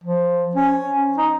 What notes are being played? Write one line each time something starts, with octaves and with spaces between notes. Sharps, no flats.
F3
C#4
D#4